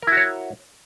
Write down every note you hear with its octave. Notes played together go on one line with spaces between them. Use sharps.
E4 F#4 A#4 C#5